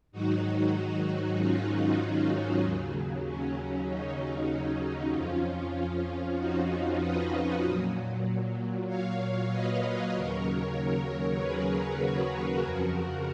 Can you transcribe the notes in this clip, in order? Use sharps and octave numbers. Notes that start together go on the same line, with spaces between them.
G#2 D#3 F#3 D#4 F#4
C#4 F4
D#4 F#4
D#4
D#2 C#3 F#3
C#4
D#4
D#4
C#4
F2 F3 C#4 F4
C#4 F4
D#4 F#4
B4 D#5
A#2 F#3
C#5 F5
B4 D#5
D#2 C#3 F#3 A#4 C#5
A#4 C#5
G#4 B4
F#4 A#4
F2 C#3 F3